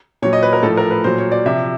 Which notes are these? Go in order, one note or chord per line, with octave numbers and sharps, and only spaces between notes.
A#2 F#3 C#5
D#5
B4
A#4
A2 F3 A4
A#4
B4
A#2 F#3 C5
C#5
D5
C3 F3 E5